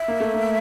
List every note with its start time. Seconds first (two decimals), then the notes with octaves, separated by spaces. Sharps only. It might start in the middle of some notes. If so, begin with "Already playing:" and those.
Already playing: E5
0.08 A#3
0.20 A3
0.34 A#3